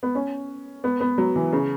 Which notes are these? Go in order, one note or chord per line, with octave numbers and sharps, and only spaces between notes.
B3
C#4
B3
B3
F#3
E3
C#3